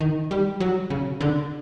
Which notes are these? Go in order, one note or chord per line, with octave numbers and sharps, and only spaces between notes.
D#3
G3
F#3
C#3
D3